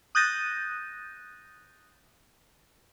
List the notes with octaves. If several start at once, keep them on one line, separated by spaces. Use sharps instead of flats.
D#6 F#6 G6 A6 A#6 D#7